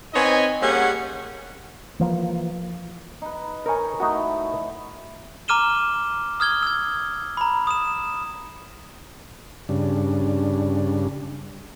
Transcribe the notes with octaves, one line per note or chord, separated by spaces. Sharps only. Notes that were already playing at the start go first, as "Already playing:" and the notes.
C4 D#4 B4 C#5 D#5 G#5
G3 A#3 C#4 G#4 F#5
E3 F3 A#3
D#4 B4
D#4 A#4 C#5 G#5
A3 D#4 E4 F#4 D#5
A#5 D6 F6 D#7 E7 G7
D#6 F6 G#6 G7
E6 G#6
A#5 B5
D#6 E7
G2 C#3 D4